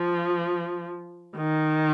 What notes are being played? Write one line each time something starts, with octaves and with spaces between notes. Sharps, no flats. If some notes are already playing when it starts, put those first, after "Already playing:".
Already playing: F3
D#3